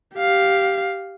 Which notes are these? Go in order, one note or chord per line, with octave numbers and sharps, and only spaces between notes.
G4 F5